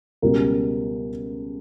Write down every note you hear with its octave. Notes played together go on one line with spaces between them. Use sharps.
C#2 B2 G3 A#4